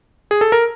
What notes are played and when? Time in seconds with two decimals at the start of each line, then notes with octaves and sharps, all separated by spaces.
0.31 G#4
0.41 A4
0.52 A#4